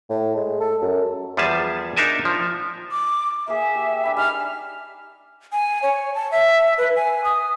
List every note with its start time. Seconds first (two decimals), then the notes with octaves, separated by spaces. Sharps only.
0.10 A2
0.35 G#3
0.60 A4
0.82 F#2
1.37 E2 F3 G3 G#4 E5 A5
1.96 D4 D#4 A#4 E5 G#5 A5
2.25 F3
2.91 D6
3.48 A#3 G#4 E5
3.75 G4
4.03 D4 G#5 B5
4.17 G3 D#4 D5 F6
5.52 G#5
5.83 C#5
6.14 A5
6.32 E5
6.78 B4
6.96 G#5
7.24 D#6